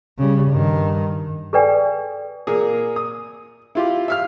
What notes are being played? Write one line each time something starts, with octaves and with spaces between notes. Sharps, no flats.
C#3 G3
G2 D#3
G#4 A4 B4 D5 G5 G#5
A#2 A#3 G#4
D#6
E4 F4 G4
E5 F5 F6